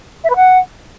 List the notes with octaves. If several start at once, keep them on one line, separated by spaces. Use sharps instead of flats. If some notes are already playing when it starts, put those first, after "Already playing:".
E5
B4
F#5